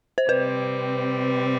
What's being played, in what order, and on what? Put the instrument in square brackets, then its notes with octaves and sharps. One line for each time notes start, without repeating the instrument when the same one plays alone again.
[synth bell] C5
[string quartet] C3 G3 C4 [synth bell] B4